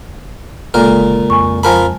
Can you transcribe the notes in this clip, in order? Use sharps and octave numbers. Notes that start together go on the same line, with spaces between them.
G1 A#2 C#3 G#3 A4 A#4
F2 G#5 C#6
F3 A#4 G#5 A5 B5